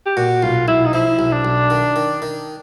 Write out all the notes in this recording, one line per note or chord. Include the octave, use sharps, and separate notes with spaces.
G4
A#2 F#4
B1 F4
B1 E4
D#4
F3 E4
B1
D4
B1
D#3
D#3
D#3